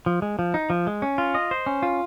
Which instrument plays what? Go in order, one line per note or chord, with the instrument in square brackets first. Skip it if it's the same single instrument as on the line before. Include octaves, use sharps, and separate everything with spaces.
[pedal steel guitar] F3
G#3
F3
D#4
F3
G#3
C#4
F4
D#5
C5
C#4
F4